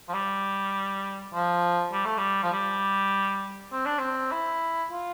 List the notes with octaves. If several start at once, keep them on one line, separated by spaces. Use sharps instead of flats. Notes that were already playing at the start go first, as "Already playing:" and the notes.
F3
G3
F3
G3
A3
G3
F3
G3
C4
D4
C4
E4
F4